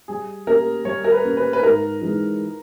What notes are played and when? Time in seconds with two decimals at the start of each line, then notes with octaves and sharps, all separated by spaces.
0.08 G3 G#4
0.47 A#3 C#4 G4 A#4
0.85 G3 C#5
1.04 A#4
1.12 B4
1.24 A#3 C#4 G4
1.37 B4
1.53 B4
1.62 G#2 A#4
2.01 E3 G#3 D#4